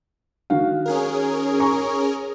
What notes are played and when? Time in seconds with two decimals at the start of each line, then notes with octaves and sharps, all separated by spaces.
0.50 D#3 F#4 F5
0.86 C#4 G#4 A#4
1.59 A#5 C#6